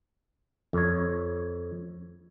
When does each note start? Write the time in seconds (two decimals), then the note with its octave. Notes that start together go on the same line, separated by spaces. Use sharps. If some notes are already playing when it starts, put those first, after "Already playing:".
0.73 F2 C#5